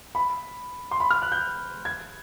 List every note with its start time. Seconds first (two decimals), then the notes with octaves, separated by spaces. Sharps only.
0.15 B5
0.91 C6
1.00 B5
1.10 F6
1.22 F#6
1.32 G6
1.85 G#6